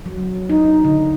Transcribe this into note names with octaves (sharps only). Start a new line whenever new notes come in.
F#3
D#4
D3